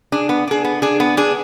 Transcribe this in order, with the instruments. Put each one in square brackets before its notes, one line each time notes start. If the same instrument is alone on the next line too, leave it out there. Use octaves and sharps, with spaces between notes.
[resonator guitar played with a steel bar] D4 G#4
B3
D4 G#4
B3
D4 G#4
B3
D4 G#4